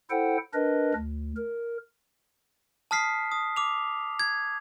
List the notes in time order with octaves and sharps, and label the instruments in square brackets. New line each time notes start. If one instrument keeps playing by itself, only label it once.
[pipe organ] E4 A4 C5 F#5 G5
D4 A#4 B4 D#5
D2
A#4
[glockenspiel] A5 D#6 F6 B6 C7
D#6
D6 F7
G#6